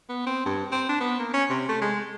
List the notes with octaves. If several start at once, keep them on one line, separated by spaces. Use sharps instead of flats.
B3
C4
G2
C4
D4
B3
A#3
C#4
C3
A3
G#3